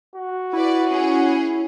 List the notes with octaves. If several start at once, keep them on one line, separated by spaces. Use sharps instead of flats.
F#4
E4 B4 D5
C#4 G#4